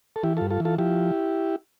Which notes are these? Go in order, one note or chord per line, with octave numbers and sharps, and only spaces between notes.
A4
E3 E4 G4
G2 F4 A4
F4 A4
E3
F4 A4
F3 E4 G4